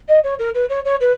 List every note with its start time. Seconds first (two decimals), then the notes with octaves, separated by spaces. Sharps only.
0.08 D#5
0.23 C#5
0.39 A#4
0.54 B4
0.69 C#5
0.85 C#5
1.00 B4